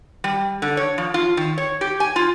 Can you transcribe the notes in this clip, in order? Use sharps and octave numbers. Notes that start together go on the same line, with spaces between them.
G3
D3
C#5
F3
F4
D#3
C#5
G4
G#5
F4